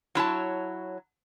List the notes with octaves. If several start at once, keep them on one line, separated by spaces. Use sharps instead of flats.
F#3 E4 C#5 A5